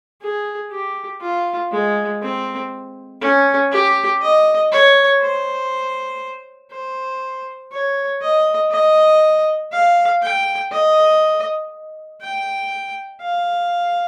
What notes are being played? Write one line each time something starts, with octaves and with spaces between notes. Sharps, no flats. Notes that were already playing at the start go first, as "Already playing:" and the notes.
G#4
G4
F4
G#3
C4
C#4
G4
D#5
C#5
C5
C5
C#5
D#5
D#5
F5
G5
D#5
G5
F5